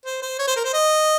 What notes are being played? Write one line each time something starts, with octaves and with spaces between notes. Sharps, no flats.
C5
C5
C#5
C5
A#4
C5
D#5